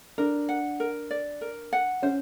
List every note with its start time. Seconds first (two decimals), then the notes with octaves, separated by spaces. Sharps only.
0.18 D4 A#4
0.49 F#5
0.80 A#4
1.10 D5
1.41 A#4
1.73 F#5
2.02 C#4 C5